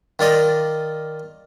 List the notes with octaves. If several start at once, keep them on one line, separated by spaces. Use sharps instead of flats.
D#3 F4 D5 D#5